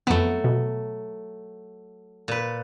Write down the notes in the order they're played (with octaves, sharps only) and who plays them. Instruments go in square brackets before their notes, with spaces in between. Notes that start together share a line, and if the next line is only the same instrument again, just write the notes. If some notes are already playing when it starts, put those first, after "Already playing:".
[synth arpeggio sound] F2 B3 [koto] F#3 A3
[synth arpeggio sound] B2
[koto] A#2 B4